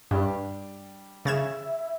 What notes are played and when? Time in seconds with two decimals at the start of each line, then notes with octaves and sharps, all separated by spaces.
0.11 G2 G3 D4 G4
1.25 C#3 E5 G#6 E7